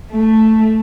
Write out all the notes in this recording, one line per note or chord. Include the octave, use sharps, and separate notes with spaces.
A3